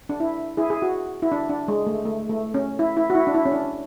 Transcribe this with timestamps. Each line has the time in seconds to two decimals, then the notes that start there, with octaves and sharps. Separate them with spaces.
0.09 D4
0.20 E4
0.57 E4 G#4
0.70 G#4
0.82 F#4
1.22 E4
1.32 D4
1.49 D4
1.68 G#3
1.87 A3
2.05 A3
2.30 A3
2.54 C#4
2.79 E4
2.97 E4
3.10 F#4
3.15 E4
3.27 D4
3.34 E4
3.45 C#4
3.52 D4